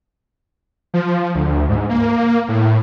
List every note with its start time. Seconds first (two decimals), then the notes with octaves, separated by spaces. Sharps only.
0.94 F3
1.35 D2
1.69 G#2
1.90 A#3
2.48 A2